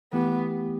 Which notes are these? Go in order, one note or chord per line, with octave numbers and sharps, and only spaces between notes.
E3 A3 B3 E4 G4